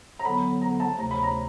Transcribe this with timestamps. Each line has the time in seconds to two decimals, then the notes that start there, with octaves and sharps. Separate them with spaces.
0.19 A#5
0.25 D3 F#3 B3 B5
0.61 A#5
0.80 A5
0.98 D2 C3 F3 A#5
1.11 B5
1.23 A#5